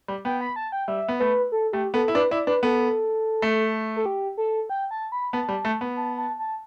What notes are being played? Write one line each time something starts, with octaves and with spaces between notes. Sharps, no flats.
G3
B3 G5
B5
A5
G5
G3 E5
B3
A3 B4
A4
A3 G4
B3 A4
E4
D4 B4
E4 D5
D4 B4
B3 A4
A3
A4
G4
A4
G5
A5
B5
B3 A5
G3
A3
B3
A5
A5
A5